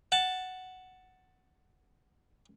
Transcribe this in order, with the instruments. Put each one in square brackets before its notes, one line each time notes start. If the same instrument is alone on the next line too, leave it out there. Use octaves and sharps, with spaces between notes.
[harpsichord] F#5 A5